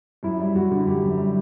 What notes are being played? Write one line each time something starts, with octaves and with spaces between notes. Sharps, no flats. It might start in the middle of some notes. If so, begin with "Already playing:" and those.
F#2 E4
G3
F#2 F#4
D3
F#2 G4
F#2
G3